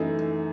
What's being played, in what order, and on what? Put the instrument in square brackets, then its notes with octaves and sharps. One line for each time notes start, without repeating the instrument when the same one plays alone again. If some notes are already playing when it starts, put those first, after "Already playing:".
Already playing: [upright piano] F#2 E3 A3 D#4 [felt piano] A4